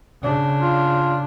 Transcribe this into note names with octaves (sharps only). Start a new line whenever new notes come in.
C#3 D4
F4